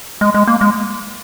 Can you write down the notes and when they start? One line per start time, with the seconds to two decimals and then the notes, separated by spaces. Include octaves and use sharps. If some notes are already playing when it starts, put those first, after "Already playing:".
0.21 G#3
0.34 G#3
0.47 A#3
0.61 G#3